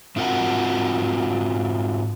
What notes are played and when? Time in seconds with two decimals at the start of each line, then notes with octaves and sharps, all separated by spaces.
0.16 G#2 C4 F4 F#4 A#4 F#5